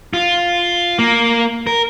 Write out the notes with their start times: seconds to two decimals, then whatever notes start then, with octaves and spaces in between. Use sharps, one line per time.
0.13 F4
0.99 A#3
1.67 A#4